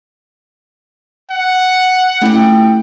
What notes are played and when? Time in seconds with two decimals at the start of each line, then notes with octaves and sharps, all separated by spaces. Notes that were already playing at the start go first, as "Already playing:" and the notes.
1.31 F#5
2.21 A3 C#4 E4 G4 G5